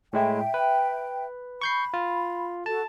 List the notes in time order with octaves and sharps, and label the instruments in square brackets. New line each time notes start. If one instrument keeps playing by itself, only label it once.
[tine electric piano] A2 G#3 E4 [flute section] E5 G5
[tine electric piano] B4
[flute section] B5 [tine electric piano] C#6 G6 C7
[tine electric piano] F4
[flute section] F#4 A4 [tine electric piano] A5